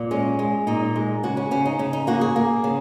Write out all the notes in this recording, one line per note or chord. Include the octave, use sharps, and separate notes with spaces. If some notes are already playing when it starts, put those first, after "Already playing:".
Already playing: A#2
G#3 C#4
G#3
A#2 D#4
G#3
C#3 F#4
C#4
C#3 C#4
D#4
C#3 C#4
D#4
A#3 F#4
G#4
A#3
C#3